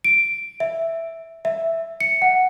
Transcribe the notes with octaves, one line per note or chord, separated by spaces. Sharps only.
D7
E5
E5
C#7
F#5